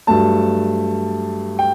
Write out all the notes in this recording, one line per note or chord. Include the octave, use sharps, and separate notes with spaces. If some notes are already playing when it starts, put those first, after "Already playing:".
G2 F#3 A3 A5
G5